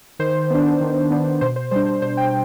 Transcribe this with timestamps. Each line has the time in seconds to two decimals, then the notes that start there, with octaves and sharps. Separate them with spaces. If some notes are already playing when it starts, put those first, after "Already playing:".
0.19 D#3 C5
0.50 B3 D4
0.81 D#3
1.10 B3 D4
1.41 B2 C5
1.56 C5
1.71 G3 D4 C5
1.86 C5
2.02 B2 C5
2.17 G5